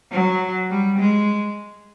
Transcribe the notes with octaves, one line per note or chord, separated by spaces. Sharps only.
F#3
G3
G#3